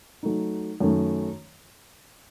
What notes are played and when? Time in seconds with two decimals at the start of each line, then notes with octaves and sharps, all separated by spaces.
0.23 F#3 A3 D#4
0.80 F#2 D#3 A3